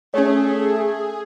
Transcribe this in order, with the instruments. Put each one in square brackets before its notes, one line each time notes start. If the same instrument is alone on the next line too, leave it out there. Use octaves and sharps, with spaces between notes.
[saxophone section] A3 [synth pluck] C#4 C#5 [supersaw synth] G#4